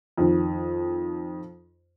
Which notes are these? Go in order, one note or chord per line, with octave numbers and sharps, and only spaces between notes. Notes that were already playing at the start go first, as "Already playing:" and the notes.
F2 D#3